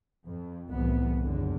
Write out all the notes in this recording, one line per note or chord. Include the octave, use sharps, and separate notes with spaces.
F2
C2 F2 A2 E3 B3
F#1 E2 D3